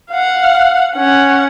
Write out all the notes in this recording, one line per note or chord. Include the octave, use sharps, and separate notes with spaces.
F5 F#5
C#4 F#5